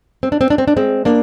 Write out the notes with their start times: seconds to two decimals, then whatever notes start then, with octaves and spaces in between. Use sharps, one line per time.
0.23 C4
0.32 D4
0.41 C4
0.50 D4
0.58 C4
0.68 D4
0.77 G#3 C4
1.05 A#3 D4